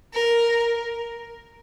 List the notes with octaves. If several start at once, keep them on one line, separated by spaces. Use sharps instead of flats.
A#4